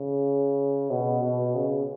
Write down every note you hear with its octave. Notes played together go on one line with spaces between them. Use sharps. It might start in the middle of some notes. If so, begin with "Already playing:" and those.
Already playing: C#3
B2
B2
C#3